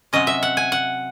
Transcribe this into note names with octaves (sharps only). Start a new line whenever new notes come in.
C3 F#3 C#4 D#5
E5
F#5
G#5
F#5